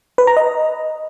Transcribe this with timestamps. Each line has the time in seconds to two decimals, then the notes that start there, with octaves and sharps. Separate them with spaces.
0.18 B4
0.27 A#5
0.37 D#5